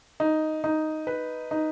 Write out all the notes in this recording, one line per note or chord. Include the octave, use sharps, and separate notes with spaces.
D#4
D#4
B4
D#4